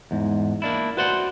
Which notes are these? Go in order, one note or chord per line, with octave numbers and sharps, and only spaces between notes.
E2 G#2
A#3 D4 E4
F#4 B4 C5 D5 F#5